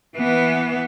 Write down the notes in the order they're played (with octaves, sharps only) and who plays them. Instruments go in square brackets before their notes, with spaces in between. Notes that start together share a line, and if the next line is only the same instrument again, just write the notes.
[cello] E3 B3